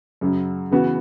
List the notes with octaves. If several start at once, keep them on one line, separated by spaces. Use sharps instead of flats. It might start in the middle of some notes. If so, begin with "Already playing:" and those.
F#2 C#3 F#3
C#3 E3 B3 F#4